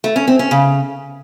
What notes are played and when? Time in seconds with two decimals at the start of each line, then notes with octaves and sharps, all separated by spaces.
0.04 A3
0.16 C#4
0.28 C4
0.39 C#4
0.51 C#3